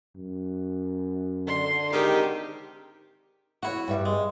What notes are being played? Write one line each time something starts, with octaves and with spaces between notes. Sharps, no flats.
F#2
D3 C6
G#2 C3 D#3 D#4 G4
E4 F#4 C#5 F#5
G2 G3 E5
G#3